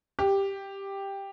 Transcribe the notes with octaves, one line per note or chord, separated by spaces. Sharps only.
G4